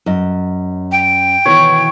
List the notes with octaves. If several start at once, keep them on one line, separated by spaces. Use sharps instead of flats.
F#2 D#5
G5
B2 D#3 E3 C#5